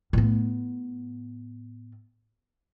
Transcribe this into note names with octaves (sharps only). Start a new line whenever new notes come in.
A2 B3